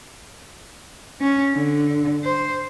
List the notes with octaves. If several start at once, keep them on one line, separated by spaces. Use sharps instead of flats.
C#4
D3
C5